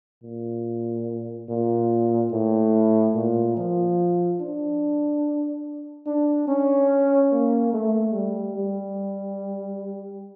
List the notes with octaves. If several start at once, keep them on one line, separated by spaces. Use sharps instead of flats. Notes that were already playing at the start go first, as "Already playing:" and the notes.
A#2
A#2
A2
A#2
F3
D4
D4
C#4
A#3
A3
G3
G3